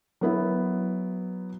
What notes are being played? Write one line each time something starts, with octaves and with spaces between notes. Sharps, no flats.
F#3 B3 E4